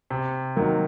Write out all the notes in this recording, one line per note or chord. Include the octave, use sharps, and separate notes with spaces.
C3
D#3 F#3 A#3